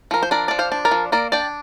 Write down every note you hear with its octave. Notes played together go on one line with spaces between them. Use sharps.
F3 A#4
C5
D4 A#4 D5
F3 D5
C5 F5
D4
A#4 D5
F3
A#3 A#4 D5
D4 D5 G5